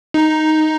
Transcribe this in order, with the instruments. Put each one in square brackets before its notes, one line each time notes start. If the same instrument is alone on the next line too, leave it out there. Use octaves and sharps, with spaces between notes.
[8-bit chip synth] D#4